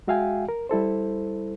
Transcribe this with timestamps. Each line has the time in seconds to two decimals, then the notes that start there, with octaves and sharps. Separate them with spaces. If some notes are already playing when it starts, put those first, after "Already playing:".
0.07 G#3 F#4 E5 F5 G5 G#5
0.49 A#4
0.69 G3 E4 A4 C5